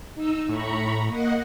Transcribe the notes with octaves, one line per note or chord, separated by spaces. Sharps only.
D#4 E6
A2 A#5 B5 C#6
A#3 D#5 F#5